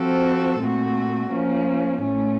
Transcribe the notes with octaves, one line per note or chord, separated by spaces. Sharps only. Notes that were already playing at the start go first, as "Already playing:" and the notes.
Already playing: F3 C4 F#4 A4
A#2 A3 C4 F#4
F3 A#3 C#4
A2 A3 C#4